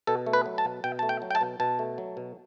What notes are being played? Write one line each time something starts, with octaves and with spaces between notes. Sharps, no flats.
B2 A4
A3
B4
F#3
A5
B2
B2 G5
A3 A5
G5
F#3
G5
A5
B2
B2 A5
A3
F#3
B2